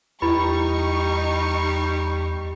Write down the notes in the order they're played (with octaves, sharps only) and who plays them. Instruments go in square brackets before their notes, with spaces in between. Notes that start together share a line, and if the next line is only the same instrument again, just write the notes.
[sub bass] E2 [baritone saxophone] G3 [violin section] D#4 C#6 [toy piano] E4 B4 B5